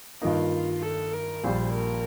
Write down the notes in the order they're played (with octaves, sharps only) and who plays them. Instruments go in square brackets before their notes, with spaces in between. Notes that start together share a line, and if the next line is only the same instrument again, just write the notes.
[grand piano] G2 D#3 A#3 D#4 [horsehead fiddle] F4
[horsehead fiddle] A4
A#4
[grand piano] A#1 A#2 G3 [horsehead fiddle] C5
[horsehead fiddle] A#4